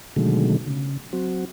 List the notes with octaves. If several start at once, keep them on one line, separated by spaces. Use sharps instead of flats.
B2 D3 D#3 F#3 G#3 A3
C#3
F#3 C4 F#4